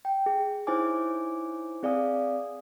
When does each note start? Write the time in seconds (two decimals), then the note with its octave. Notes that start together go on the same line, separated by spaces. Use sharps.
0.05 G5
0.26 G#4
0.67 D#4 E4 C5 C#5 G#5 D6
1.83 C4 G#4 D5 F5 G#5 D#6